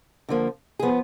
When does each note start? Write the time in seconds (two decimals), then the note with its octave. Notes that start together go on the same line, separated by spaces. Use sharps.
0.29 D3 F3 A#3
0.79 F3 B3 G#4